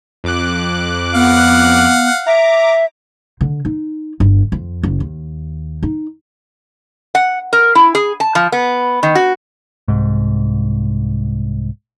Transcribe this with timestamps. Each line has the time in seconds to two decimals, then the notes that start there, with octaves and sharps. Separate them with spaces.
0.24 F2 D6 F#6
1.15 B3 F5 F#5
2.27 E5 A#5 D6
3.41 D3
3.65 D#4
4.20 G1
4.52 F2
4.83 F#1
5.00 D#2
5.83 D#4
7.15 F#5
7.53 A#4
7.75 E4
7.95 G#4
8.20 A5
8.35 F3
8.52 B3
9.03 D#3
9.15 F#4
9.88 C2 G#2